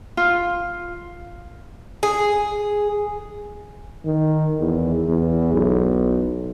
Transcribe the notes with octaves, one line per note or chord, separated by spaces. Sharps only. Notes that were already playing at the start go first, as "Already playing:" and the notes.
F4
G#4
D#3
E2
E2
B1